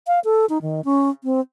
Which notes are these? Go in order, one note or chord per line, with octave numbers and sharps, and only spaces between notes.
F5
A4
D#4
D#3
C#4
C4